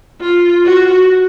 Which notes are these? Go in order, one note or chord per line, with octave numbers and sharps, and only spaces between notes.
F4
F#4